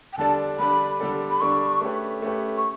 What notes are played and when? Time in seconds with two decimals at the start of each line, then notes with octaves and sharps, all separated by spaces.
0.13 G5
0.18 D3 G3 D4 A4 D5 A5
0.59 D3 G3 D4 A4 D5 B5
1.00 D3 G3 D4 A4 D5
1.30 B5
1.41 D3 G3 D4 A4 D5 C#6
1.81 A3 C#4 G4 B4
2.22 A3 C#4 G4 B4
2.57 C#6